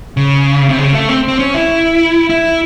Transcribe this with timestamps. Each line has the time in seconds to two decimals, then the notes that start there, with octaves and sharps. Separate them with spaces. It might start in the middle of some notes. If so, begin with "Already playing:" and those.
0.17 C#3
0.69 C3
0.78 C#3
0.93 A3
1.09 C4
1.28 C4
1.39 C#4
1.54 E4
2.30 E4